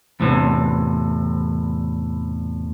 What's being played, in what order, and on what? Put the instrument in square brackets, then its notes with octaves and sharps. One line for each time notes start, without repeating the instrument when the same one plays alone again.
[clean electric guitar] E2 A2 C3 E3